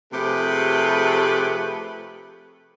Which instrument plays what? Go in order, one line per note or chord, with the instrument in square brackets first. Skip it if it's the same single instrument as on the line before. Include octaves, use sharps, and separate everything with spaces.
[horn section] C3 F3 A3 G4 G#4 B4